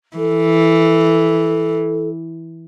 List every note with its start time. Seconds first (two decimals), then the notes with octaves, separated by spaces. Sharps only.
0.17 E3 A4